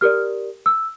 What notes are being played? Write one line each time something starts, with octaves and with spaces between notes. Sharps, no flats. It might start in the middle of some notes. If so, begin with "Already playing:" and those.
G4 A#4 D5 F6
E6